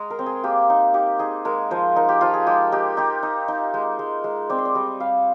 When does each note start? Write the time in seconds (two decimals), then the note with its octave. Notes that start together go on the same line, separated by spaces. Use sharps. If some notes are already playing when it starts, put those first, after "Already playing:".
Already playing: G#3 G#4 A#5 C6
0.10 A#4
0.19 C4
0.26 G#4
0.44 A#3 G4
0.70 D#4
0.94 D#4 G4
1.19 D#4 G#4
1.45 G#3 A#4
1.71 F3 C5
1.96 D#4 A#4
2.08 G4
2.21 F3 F4
2.34 G#4
2.46 G#3 G4
2.72 D#4 G4
2.97 D#4 G4
3.23 D#4
3.48 D#4
3.74 G#3
3.99 G#3
4.24 G#3
4.49 C4 D5
4.58 C5
4.65 D5
4.75 G3 D#5
5.00 G3 F5